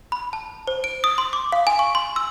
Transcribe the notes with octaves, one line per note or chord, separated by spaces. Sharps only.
B5
A5
C5
D7
D#6
C6
D6
F5
G#5
C#6
C6
E6